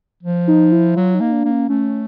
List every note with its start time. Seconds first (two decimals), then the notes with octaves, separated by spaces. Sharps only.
0.23 F3
0.48 D#4
0.72 E4
0.96 F#3 F4
1.14 D#4
1.20 A#3
1.32 D4
1.45 A#3
1.51 C#4
1.69 A3 C#4